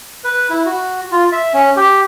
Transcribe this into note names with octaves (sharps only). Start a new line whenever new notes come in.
B4
E4
F#4
F4
E5
C#4
G4